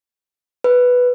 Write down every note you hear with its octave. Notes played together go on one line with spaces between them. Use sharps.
B4